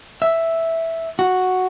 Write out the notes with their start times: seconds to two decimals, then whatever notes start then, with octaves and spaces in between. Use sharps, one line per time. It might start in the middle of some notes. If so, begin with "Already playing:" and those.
0.22 E5
1.19 F#4